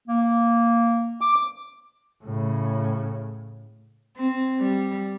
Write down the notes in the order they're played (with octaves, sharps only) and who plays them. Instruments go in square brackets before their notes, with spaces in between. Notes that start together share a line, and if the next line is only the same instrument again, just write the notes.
[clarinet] A#3
[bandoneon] D6
[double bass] A2 C#3
[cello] C4
G3